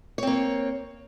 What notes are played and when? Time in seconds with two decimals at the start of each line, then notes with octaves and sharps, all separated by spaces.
0.18 C#5
0.23 C4
0.27 A#3